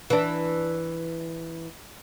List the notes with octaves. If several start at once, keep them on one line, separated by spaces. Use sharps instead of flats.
E3 D4